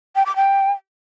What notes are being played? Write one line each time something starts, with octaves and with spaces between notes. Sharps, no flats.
G5
D6
G5